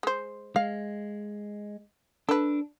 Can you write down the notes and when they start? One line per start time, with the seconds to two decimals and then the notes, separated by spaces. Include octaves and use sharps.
0.03 G#3 C5
0.56 G#3 F5
2.29 D4 A4 B4